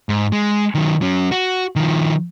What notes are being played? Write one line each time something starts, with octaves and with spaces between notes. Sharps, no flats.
G#2
G#3
D#3 F#3
F#3 C#4
F#4
D#3 F3